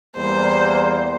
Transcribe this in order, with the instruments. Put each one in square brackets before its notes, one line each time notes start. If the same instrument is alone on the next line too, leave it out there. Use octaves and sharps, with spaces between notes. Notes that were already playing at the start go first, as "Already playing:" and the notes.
[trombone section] E2 G3 A#3 [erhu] C5